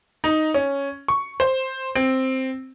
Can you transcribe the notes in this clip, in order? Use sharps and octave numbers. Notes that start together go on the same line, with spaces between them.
D#4
C#4
C#6
C5
C4